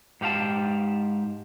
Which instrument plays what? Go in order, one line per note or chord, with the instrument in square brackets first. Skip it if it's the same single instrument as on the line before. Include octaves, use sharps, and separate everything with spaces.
[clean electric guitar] G#2 G4 F5 A5